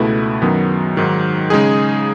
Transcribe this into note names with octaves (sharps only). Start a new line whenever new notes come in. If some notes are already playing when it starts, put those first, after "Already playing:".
Already playing: C#2 B2 A3 E4 B4
F#2 D#3 F#3 B3
G#2 D#3 F#3
C#3 G#3 D#4 G#4